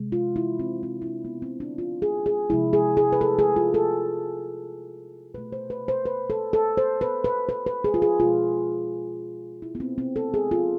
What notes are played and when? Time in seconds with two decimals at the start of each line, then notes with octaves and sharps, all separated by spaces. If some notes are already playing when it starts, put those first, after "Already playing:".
Already playing: C3 G#3
0.12 F4
0.36 E4
0.60 C4
0.83 C4
1.02 E4
1.07 D4
1.25 B3
1.42 C4
1.60 D4
1.78 F4
2.02 G#4
2.26 G#4
2.49 C3 F3 G#3 E4
2.73 G#4
2.97 G#4
3.13 B4
3.21 A4
3.39 G#4
3.56 F4
3.74 A4
5.34 B2 A3 B4
5.52 C5
5.70 B4
5.88 C5
6.05 B4
6.30 A4
6.53 A4
6.77 C5
7.01 B4
7.24 B4
7.49 B4
7.66 B4
7.84 G#4
7.94 F4
8.02 G#4
8.20 B2 G#3 F4
9.62 E4
9.75 B3
9.80 C4
9.98 C4
10.16 A4
10.34 G#4
10.51 F4